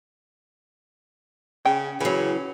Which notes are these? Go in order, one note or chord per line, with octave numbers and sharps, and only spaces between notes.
C#3 G5
C#3 E3 F#3